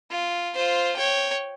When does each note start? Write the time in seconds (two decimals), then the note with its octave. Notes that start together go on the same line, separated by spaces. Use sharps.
0.11 F4
0.54 F4 C5
0.97 C#5 G5